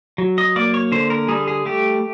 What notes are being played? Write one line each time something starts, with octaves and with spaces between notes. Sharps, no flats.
F#3
D#5
A#3 D5
C#5
D3 C5
A#4
G3 G#4
G#4
A3 G4